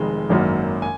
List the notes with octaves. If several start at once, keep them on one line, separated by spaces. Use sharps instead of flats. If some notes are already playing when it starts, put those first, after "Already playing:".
Already playing: F1 F2 D#3 G#3
G#1 F#2 D#3 F#3 A#3
G#5